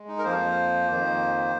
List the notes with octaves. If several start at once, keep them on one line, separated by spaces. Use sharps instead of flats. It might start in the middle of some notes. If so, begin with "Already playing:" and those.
Already playing: G#3
D#4
A#4
F2 F3 A#3 C5
F2 D#3 A#3